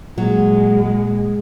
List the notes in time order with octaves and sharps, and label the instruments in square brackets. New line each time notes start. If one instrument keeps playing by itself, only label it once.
[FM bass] A#2 [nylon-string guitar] F#3 [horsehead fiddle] G#3